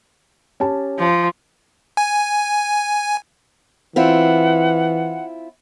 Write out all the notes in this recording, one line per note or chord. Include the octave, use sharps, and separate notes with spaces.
C#4 G4 A5
F3
G#5
E3 C4 E4 F4 F#5